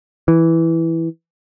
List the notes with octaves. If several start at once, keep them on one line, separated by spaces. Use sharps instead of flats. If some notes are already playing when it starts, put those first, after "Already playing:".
E3